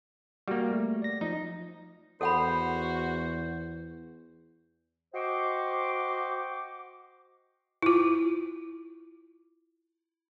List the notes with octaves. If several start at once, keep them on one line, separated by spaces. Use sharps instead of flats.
G3 A#3 F#4
A3
D5 A#6
F3 D#4 D#5
E2 F#4 A4 C5 F#5 B5
F#4 C5 D#5 G5 C#6 D6
E4 F4